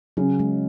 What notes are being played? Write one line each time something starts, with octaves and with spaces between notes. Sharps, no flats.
C#3 F#3
G#3